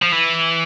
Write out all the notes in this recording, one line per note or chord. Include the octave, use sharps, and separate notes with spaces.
F3
E3